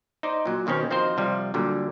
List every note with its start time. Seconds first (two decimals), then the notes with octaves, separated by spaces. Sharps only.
0.23 D#4 C5 D5
0.46 A#2 F#3
0.66 D#2 B2 D#3 C4 C#4
0.90 F3 C4 D#4 F#4 A#4 C5
1.17 C3 F3 G3
1.54 A#2 D3 F#3 G3